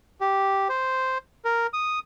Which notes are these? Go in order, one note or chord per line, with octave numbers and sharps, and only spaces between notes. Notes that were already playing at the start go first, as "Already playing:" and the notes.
G4
C5
A#4
D#6